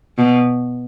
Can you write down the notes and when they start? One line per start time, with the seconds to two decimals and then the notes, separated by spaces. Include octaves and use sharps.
0.18 B2